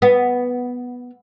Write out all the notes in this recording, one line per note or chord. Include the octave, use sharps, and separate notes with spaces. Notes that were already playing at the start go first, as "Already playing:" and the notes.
B3